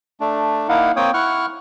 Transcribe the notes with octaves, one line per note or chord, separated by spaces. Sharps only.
A3 D4
A#3 D#4 E4 F5 F#5
A#3 C4 C#5 G5 D#6
E4 F#5 C#6 F6 F#6